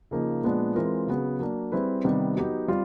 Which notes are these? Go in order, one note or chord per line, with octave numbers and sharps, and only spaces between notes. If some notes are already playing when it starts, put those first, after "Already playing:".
C#3 F3 A#3 D#4
A#2 F3 G#3 B3 D4
E3 G#3 C4 F4 A#4
C#3 F#3 B3
F#3 A#3 D4
G3 C4 E4 G#4 B4
C3 D#3 G3 B3
F#3 B3 D#4 G4
G3 C4 F4